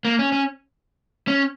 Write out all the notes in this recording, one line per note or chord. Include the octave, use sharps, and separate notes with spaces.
A#3
C#4
C#4
C#4